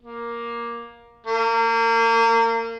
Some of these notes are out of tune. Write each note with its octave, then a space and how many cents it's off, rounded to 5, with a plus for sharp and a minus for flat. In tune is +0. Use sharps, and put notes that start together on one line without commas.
A#3 +10
A#3 -30